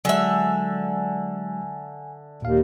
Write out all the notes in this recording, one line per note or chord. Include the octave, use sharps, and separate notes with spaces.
D3 F#3 G#3 E5 G#5
D#2 A#2 F5